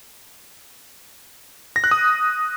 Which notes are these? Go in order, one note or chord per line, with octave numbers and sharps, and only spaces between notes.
A#6
F#6
D#6